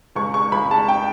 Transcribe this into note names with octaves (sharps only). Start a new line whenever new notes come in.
C#2 C#6
C#6
C#2 B5
A5
G5